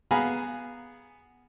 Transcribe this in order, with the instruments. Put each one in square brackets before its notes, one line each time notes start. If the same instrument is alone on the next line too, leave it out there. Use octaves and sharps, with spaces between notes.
[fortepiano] B3 G#4 F5 G#5 A#5 B5